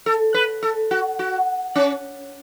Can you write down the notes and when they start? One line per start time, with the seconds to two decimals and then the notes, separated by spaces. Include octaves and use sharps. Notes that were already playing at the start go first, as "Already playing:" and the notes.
0.06 A4
0.34 B4
0.63 A4
0.91 F#4
1.19 F#4
1.76 C#4